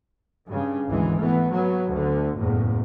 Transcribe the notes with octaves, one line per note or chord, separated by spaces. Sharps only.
G2 C#3
G#1 D2 E3 G#3
E3 A3 B3
F#3 B3
D2 D3
F#1 E2 A2